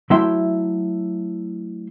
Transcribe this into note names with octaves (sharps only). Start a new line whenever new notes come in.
F#3 A3 E4 E5 G5 C6